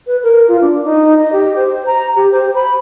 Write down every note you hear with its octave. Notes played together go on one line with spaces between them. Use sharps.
B4
A#4
F4
D4
D#4
D#5
G4
C5
A#5
G4
C5
B5